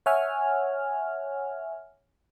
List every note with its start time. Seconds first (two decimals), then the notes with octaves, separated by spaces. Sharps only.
0.06 C#5 E5 F#5 G#5 F6